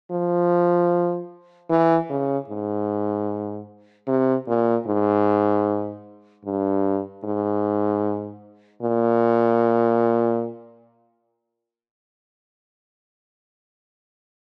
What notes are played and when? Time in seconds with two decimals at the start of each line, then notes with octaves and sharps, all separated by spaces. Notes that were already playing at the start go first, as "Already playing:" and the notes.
0.11 F3
1.70 E3
2.10 C#3
2.49 G#2
4.07 C3
4.48 A#2
4.87 G#2
6.45 G2
7.25 G#2
8.82 A#2